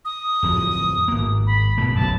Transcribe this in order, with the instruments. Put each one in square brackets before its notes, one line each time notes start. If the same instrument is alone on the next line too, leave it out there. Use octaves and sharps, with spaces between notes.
[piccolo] D#6
[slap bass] D1 F2 F3
G#1 A#3
[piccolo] B5
[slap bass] F#2 B2 A3
[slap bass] F#1 B1 F#2 [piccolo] A5